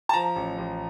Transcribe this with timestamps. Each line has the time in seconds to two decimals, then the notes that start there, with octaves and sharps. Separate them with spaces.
0.09 A5
0.13 F3 A#5
0.36 A1
0.58 A1